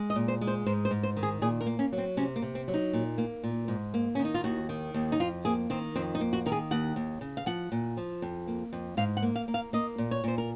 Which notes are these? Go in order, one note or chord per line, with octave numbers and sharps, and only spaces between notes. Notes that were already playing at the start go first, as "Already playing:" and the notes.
Already playing: G#3
D#5
A#2
C5
G#3
C5
G#2 C5
C5
G#2
C5
D#3
G#4
A#2 G#4
A#4
A#3
C#4
F#3
C4
C3 C#4
A#3
C3
C4
F#3
D#4
A#2
A#3
A#2
G#2
A#3
D#3 C#4
D#4
F4
D#2 F#4
D#3
D#2
D#4
F2 F4
A#3 G#4
D#3 C4
F2 C4
D#4
A#3
F#4
D#3 A#4
G#4
D#2 F#5
D#2
C#3
F5
F3 F#5
A#2
F3
F2
A#3
F2
G#2 F5
F#5
A#3
F5
A#3
F5
A#3 D#5
A#2
C#5
A#2 C5
A#4